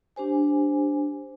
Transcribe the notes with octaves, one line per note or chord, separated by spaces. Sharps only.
D4 G4 C5 G#5